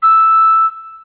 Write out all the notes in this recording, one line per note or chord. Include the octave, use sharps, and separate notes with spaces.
E6